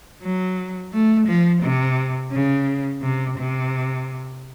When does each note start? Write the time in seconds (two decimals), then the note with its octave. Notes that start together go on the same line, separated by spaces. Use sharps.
0.23 F#3
0.93 A3
1.27 F3
1.63 C3
2.32 C#3
3.02 C3
3.38 C3